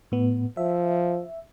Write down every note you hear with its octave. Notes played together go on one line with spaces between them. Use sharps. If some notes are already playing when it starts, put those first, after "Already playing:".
A2 B3
F3 E5